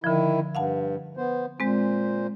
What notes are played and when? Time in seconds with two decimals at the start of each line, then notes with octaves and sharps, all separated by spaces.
0.04 D3 D#3 F3 E4
0.55 G2 F5 F#5 A5
1.17 B3 C5
1.60 A#2 G#3 C4 C5